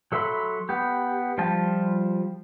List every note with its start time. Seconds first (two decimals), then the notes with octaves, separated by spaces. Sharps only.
0.12 F#3 A4 E5 B5 C6
0.69 B3 G4
1.38 F3 G3 F4 A5